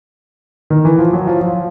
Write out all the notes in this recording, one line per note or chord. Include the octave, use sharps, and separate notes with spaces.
D#3
E3
F3
F#3
F3
F3